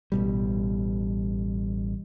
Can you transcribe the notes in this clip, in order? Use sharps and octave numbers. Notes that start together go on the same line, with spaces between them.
A1 B2 G3